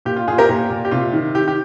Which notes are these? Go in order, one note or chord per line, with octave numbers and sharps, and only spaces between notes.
A#2 G4
F4
A#2 F4 G#4
G4 A#4
A#2 G4
A#2
G4
C3 F4
D#3
D#3 G4
G4